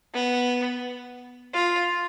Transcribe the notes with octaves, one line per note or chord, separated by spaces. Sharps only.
B3
F4